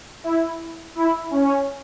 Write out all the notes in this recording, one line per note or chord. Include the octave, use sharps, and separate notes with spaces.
E4
E4
C#4